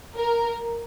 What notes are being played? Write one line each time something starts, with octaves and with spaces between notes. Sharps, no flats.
A#4